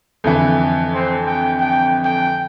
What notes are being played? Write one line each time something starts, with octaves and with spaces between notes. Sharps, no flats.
F2 D3 E3
C4
G5
G5
G5